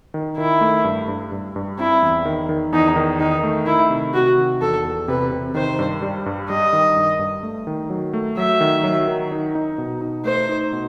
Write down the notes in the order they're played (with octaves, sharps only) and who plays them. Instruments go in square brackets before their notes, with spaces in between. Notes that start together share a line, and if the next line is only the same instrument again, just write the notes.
[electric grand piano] D#3
[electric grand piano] D#3 [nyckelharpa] E4
[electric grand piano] A3
G2
G2
G2
G2
[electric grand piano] C4 [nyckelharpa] E4
[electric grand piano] E2
D#3
D#3
[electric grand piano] E2 [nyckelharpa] D#4
[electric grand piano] D#3
[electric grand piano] D#3 [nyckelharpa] D#4
[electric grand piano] A3
[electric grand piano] D#3 [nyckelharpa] E4
[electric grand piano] C3
[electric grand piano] C3 [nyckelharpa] F#4
[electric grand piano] D#3
[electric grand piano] E2 [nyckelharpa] A4
[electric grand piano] E2
[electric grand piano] C3 [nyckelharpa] B4
[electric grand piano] C3
[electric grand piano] D#3 [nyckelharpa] C5
[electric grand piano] G2
G3
G2
[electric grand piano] G3 [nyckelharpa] D#5
[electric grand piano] D#3
G2
G2
A3
D#3
F#3
A3
[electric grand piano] F#3 [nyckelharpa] E5
[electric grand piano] D#3
F#3
D#3
D#4
D#4
B2
D#4
[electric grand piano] A3 [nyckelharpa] C5
[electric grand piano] D#4
B2